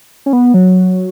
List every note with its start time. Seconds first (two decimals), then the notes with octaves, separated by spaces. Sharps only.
0.26 C#4
0.33 B3
0.54 F#3